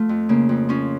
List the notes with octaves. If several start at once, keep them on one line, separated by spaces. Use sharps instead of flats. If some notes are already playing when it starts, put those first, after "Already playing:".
Already playing: F3 A3 F4
F2
C#3 A#3
F2
F3 C#4